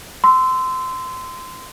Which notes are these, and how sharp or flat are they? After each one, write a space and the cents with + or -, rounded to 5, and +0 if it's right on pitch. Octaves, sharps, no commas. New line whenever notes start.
C6 -25 E6 +0